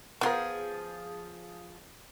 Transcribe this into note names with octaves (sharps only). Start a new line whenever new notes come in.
F3 B3 F4 G#4 A#4